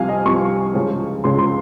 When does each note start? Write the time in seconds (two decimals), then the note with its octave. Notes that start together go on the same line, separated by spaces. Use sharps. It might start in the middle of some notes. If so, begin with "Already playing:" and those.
Already playing: C2 C3 F3 F5 G#5
0.09 D#5
0.25 C2 C3 F3 C#6
0.74 C#2 C#3 F3
1.24 C#2 C#3 F3 C6
1.38 C6